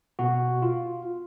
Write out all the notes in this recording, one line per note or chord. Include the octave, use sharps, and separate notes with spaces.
B2 F#4
F4